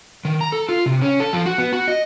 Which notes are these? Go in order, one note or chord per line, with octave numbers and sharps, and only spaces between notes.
D#3
A#5
A4
F4
C3
C#4
A4
F3
F#4
B3
F#4
D#5